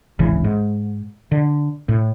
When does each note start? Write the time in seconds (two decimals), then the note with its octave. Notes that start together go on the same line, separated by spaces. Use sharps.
0.19 D1 G#1 C#3 E3
0.44 G#2
1.32 D3
1.89 A2